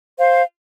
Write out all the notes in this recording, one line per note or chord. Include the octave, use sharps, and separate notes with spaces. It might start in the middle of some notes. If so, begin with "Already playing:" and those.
C5 F5